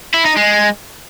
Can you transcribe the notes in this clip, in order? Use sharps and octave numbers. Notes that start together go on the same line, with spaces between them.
E4
D#4
G#3